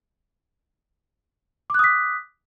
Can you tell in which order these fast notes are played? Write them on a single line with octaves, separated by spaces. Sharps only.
D6 F#6 D#6 B6